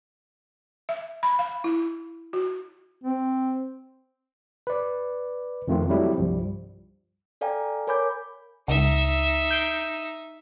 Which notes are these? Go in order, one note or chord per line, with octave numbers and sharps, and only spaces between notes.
E5
B5
F5
E4
F#4
C4
B4 D5
F2 D#3 A3 C4 F4
F#3 G3 A3 C4 E4
C2 G2 F3 G3
A4 D5 F5 G5 G#5 A#5
A#4 C#5 G#5 B5 D6 G6
C#2 D#4 E5
G6 C7 D7